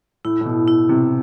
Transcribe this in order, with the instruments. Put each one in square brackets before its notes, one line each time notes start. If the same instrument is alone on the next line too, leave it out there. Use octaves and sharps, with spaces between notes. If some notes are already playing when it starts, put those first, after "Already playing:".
[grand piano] A2 [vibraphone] E4
[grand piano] A2
B2
[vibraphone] E4
[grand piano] C3